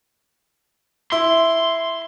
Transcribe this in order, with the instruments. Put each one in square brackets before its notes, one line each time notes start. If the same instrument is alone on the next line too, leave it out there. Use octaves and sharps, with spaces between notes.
[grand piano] E4 [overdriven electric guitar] C6